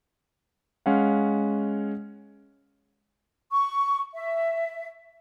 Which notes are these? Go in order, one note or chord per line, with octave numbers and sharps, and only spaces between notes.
G#3 C#4 F5 F#5
C#6
E5